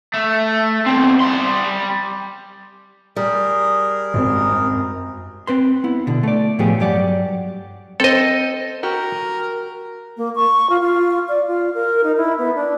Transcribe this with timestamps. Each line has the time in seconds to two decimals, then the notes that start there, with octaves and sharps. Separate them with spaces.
0.14 A3
0.86 E2 C4
1.20 G3 C6
3.16 G3 G#4 A#4
4.14 G#1 F#2 C4
5.47 C4 B4 C6
5.84 B3 E4
6.07 B2 D3
6.23 A3 D5
6.59 A2 F3 A3 B3 G4 G#4
6.79 G2 F#3 G4 D5 F#5
8.00 C4 A4 C5 D#5
8.83 F#4 G4 A#4
10.17 A#3
10.35 C#6
10.69 F4
10.81 F4
11.28 D5
11.47 F4
11.74 A#4
12.03 D#4
12.17 E4
12.38 B3
12.55 D4